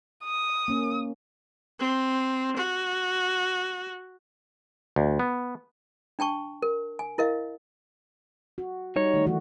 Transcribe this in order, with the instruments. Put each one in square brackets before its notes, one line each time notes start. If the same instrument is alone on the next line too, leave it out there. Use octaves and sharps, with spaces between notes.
[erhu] D#6
[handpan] A#3 C#4
[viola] C4
F#4
[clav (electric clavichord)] D2
B3
[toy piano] D4 G5 A5 C#6
A#4
G#5
E4 A#4 D#5 F5
[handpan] F#4
[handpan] G3 [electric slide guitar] D#4 C#5
[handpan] D#3 A3
E3 A3 F#4